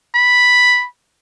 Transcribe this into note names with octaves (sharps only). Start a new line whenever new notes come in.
B5